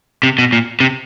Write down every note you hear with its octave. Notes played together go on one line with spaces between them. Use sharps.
C3
B2
A#2
C3